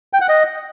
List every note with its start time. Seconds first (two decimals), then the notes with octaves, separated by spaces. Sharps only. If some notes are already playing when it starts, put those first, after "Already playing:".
0.13 G5
0.21 F#5
0.29 D#5